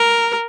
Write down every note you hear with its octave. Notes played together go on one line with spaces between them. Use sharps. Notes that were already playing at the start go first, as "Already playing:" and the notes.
Already playing: A#4